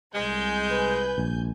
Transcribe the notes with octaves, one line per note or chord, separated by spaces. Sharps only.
C2 G#3 G#5 G6
B4
A#1